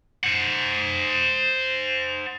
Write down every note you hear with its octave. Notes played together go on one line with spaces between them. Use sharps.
C5 F#5